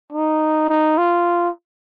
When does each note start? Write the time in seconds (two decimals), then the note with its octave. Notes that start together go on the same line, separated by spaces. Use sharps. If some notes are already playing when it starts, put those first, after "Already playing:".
0.13 D#4
0.69 D#4
0.98 F4